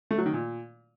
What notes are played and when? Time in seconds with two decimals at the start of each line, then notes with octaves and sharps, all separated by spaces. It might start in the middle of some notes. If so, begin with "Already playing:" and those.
0.11 A3
0.18 F#3
0.26 D#3
0.33 A#2